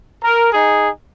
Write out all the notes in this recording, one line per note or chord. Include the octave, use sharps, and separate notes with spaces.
A#4
D#4 G#4